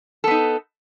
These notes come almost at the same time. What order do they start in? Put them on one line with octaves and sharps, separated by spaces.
A4 B3 D#4